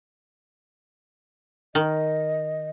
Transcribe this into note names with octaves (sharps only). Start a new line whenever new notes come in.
D#3 D#5